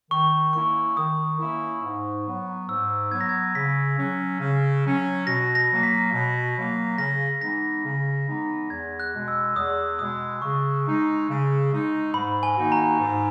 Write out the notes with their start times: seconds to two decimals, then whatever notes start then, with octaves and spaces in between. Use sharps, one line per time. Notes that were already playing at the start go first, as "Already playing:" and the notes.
0.11 D#3 C#6
0.53 A#3 C#4 E4 C#6
0.97 D#3 D#6
1.40 A#3 C#4 E4
1.82 G#2
2.26 F#3 B3
2.69 G#2 E6
3.11 F#3 B3 G#6
3.21 A#6
3.29 G#6
3.55 C#3 B6
3.98 F#3 C#4
4.40 C#3
4.84 F#3 C#4
5.27 B2 A#6
5.55 A#6
5.70 F#3 A#3
5.83 B6
6.13 B2
6.56 F#3 A#3
6.98 C#3 A#6
7.41 E3 G#3 B3 D#4 A#6
7.84 C#3
8.27 E3 G#3 B3 D#4
8.70 E2 G#6
9.00 F#6
9.13 B2 G#3
9.28 E6
9.56 E2 D#6
9.99 B2 G#3 D#6
10.42 C#3 C#6
10.86 G#3 D#4
11.28 C#3
11.71 G#3 D#4
12.14 G#2 B5
12.43 G#5
12.57 D#3 A#3 D#4 F#4
12.72 A#5
13.00 G#2